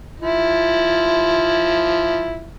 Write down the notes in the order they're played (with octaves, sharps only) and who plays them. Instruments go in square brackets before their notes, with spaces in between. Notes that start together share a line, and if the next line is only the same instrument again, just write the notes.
[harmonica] F3 E4